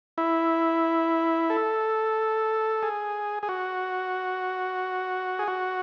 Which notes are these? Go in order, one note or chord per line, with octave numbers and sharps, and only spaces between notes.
E4
A4
G#4
G#4
F#4
G#4
F#4